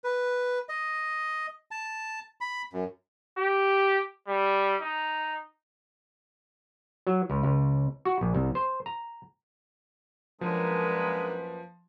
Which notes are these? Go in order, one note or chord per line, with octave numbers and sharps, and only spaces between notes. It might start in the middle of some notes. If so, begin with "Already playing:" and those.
B4
D#5
A5
B5
F#2
G4
G3
D#4
F#3
C#2
C#2
F#4
A#1
C2
C5
A#5
F#2 F3 G#3 A#3 D4 A#4 B4